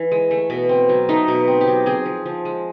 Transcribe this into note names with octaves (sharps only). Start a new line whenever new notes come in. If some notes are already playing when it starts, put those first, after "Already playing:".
Already playing: E3
G#3
A3
B2
C4
F#3
A3 D#4
B2
C4
G4
F#3
C4 G#4
F3
F3
G#3